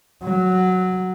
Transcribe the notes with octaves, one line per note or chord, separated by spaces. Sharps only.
F#3